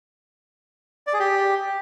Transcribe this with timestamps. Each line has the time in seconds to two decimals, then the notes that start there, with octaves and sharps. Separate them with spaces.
1.07 D5
1.13 G#4
1.19 G4